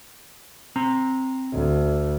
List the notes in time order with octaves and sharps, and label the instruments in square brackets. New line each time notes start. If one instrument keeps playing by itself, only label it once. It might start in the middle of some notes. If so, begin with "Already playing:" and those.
[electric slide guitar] C4 A#5
[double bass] D2